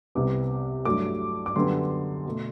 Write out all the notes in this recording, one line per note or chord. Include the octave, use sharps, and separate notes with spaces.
C2 C3 G3 B3 D6
G2 F#3 A3 D6
D6
F#2 D3 G3 B3 C6
B2 A3